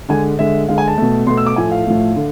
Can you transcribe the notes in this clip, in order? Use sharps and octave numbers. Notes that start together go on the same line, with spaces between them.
D3 G#3 G#5
D3 G#3 E5
D3 G#3 F5
G#5
A5
B2 A3
B2 A3 C6
E6
D6
A2 F3 A3 G#5
F5
A2 F3 A3
D3